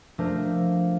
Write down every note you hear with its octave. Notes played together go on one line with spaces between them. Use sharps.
F3 A3 A#3 D4 A#4 C5